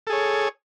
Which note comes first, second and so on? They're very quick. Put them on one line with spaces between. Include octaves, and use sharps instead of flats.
A4 G#4 C#5